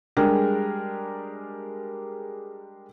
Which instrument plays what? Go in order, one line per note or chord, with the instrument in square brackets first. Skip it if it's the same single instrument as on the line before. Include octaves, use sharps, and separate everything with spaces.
[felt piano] G3 G#3 D4 G4 G#4 A#4